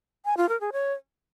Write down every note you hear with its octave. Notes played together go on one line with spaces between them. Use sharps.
G#5
F4
A#4
G#4
C#5